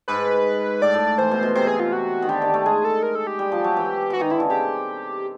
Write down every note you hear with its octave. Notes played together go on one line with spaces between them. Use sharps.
G#2 B4
A2 D5
A2
E3 C5
B2
B2
C3 C5
G#4
F4
F#4
D#3
D3 G4
D#3
A3
G#3 G#4
A4
A#4
A4
G4
G3
F3
F#3
E3
E3 F#4
D#3 D#4
D3 E4
C#3
C3 G4